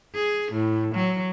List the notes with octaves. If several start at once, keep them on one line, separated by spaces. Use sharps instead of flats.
G#4
A2
F#3